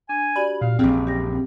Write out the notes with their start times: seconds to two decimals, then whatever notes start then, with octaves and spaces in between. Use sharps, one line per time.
0.09 D4 G#5
0.36 F#4 G4 D5 B5
0.61 A#2 F5
0.79 A#1 F#2 E3 C4 G#4
1.07 G4 A#6